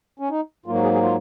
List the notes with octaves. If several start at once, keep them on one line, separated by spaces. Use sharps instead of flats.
C#4
D#4
G#2 F#3 A#3 F4
F#4
G#4
G#4
F4